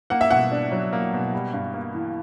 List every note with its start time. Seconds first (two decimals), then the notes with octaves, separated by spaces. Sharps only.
0.10 A#3 F#5
0.21 E5
0.31 B2 F#5
0.51 D4
0.72 F#3
0.93 A#3
1.13 B2
1.33 G3
1.53 G2
1.74 A#3
1.94 E3